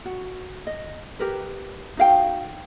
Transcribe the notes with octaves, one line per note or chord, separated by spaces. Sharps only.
F#4
D#5
G4 A#4 B4
D#4 F#4 F5 G5